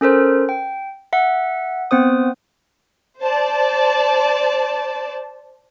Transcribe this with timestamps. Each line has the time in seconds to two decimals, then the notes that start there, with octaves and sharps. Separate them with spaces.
0.01 C#4 A4 A#4 C5
0.49 G5
1.13 E5 F#5
1.91 B3 C4 C5 D#6
3.22 C5 D5 A5